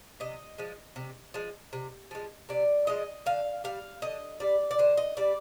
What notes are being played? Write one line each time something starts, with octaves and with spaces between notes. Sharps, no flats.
C3 D#5
F3 G#3
C3
F3 G#3
C3
F3 G#3
C3 D5
F3 G#3 D#5
D3 F5
G3 F5
D3 D#5
G3 D5
D5
D3 C5
D#5
G3 D5